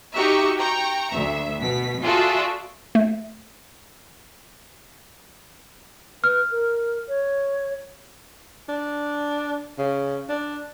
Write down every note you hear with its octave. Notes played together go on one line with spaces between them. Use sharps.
D#4 F#4 G4 E5 A#5 C#6
G5 A#5 C#6
D2 E5
B2 B6
F4 F#4 G#4 A4 D5 E5
A3
B4 F6
A#4
C#5
D4
C#3
D4